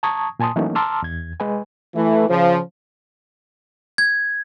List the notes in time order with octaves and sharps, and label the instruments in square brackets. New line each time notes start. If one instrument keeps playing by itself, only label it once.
[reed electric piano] A5 A#5 C#6 D#6 G#6
A#2 G#5 A5 C6 D#6
E3 F#3 A3 A#3 C#4 D#4
A5 A#5 C6 D6 E6 F6
E2 G#6
G#3 B4 G#5
[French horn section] E3 A3
C#3 F3
[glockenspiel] G#6